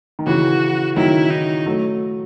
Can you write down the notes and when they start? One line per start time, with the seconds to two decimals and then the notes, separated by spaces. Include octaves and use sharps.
0.19 D#3
0.26 C#3 E3 F#4
0.96 D#3 F#3 E4
1.31 D#4
1.66 F#3 A3